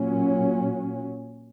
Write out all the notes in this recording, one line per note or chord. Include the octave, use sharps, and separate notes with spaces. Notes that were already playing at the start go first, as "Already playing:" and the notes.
Already playing: A#2 F#3 C#4